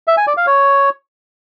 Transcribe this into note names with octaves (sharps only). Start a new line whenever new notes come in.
E5
G#5
D5
F5
C#5